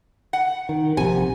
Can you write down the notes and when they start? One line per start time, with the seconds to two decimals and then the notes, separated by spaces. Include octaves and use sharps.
0.33 F#5
0.69 D#3
0.97 A#1 C3 G#5